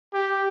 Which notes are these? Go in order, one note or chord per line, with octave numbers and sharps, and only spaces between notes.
G4